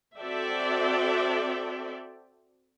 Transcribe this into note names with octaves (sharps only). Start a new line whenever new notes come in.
C4 F#4 A4 D5 E5 G5